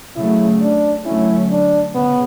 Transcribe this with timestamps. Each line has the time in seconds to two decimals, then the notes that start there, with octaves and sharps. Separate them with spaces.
0.16 C#3 F#3 A3 E4
0.61 D4
1.05 D3 F#3 A3 C#4 E4
1.50 D4
1.95 C#3 B3